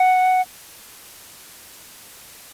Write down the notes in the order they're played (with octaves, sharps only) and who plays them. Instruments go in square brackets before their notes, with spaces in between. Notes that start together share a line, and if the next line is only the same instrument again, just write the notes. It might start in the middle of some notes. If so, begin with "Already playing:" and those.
Already playing: [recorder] F#5